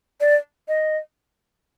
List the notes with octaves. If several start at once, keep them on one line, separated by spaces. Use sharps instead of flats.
D5
D#5